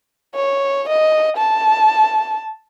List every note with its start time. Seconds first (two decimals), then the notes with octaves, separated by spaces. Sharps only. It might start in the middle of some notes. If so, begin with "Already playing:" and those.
0.35 C#5
0.89 D#5
1.37 A5